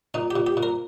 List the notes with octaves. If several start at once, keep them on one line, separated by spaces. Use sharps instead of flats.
A#2 D#4
G4
A#2
G4
A#2
A#4